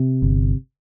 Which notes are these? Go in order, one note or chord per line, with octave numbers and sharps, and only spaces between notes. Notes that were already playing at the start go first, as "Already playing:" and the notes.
Already playing: C3
G1